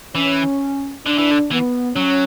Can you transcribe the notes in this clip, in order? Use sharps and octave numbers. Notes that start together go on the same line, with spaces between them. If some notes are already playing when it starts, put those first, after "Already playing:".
E3 C#4
D3 D4
E3
D3
E3 B3
F#3 C#4